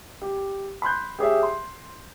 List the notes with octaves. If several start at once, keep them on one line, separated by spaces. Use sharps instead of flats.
G4
B5 C6 F#6 G6
G4 G#4 C#5 E5
C6